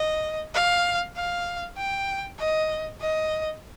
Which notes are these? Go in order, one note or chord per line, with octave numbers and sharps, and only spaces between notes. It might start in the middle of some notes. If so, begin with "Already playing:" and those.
Already playing: D#5
F5
F5
G5
D#5
D#5